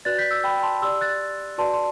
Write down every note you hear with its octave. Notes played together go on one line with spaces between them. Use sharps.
F#4 B4 D5 F#6 A6
G6 B6
E6 G6
G5 B5
A5 C6
G4 D5 C6 E6
F#6 A6
F#4 B4 D5 A5 C6
C6